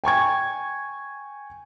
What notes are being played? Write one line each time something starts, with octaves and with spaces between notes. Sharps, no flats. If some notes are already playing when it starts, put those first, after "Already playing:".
G5 G#5 C#6 G#6